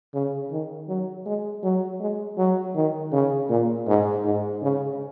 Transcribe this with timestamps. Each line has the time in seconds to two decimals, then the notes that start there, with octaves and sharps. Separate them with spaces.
0.14 C#3
0.51 D#3
0.88 F#3
1.26 G#3
1.63 F#3
2.00 G#3
2.38 F#3
2.75 D#3
3.12 C#3
3.50 A#2
3.87 G#2
4.25 G#2
4.62 C#3